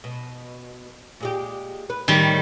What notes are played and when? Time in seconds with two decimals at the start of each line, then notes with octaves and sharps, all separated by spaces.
0.04 B2
1.20 A#2 G#3 G4
1.90 B4
2.08 A2 D#3 G3 G4